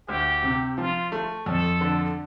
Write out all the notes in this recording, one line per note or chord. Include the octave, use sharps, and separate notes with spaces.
D2 G4
C3
F3 F4
A3
F2 A4
D3